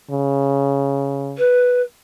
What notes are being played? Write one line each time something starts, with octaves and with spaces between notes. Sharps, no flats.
C#3
B4